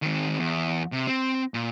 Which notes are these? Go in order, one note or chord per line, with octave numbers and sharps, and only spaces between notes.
D#3 C4
E2
C3
C4
A#2